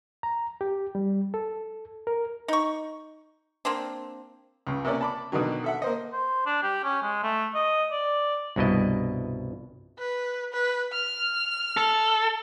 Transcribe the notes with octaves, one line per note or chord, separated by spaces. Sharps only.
A#5
G4
G3
A4
A#4
D#4 C#6
A#3 C4 D4
C#2 C#3
C3 A#3 C#4 D5
A5 B5 D6
B2 D3 D#3 F#3
A4 E5 F#5
A#3 C5 D#5
C5
D4
G4
C#4
G#3
A3
D#5
D5
C2 G2 B2 E4 D#5
B4
B4
F6
A4